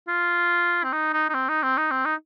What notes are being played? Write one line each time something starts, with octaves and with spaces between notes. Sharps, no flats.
F4
C4
D#4
D#4
D#4
C4
D#4
C4
D#4
C4
D#4